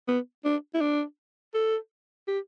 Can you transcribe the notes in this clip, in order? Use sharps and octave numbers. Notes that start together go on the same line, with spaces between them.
B3
D4
E4
D4
A4
G4